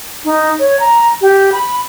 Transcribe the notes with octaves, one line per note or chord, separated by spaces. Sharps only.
D#4
C#5
A#5
G4
B5